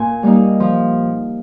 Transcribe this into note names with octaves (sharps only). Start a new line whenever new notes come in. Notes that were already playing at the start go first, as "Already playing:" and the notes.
Already playing: A#2 G#5
G3 A#3 D#4
F3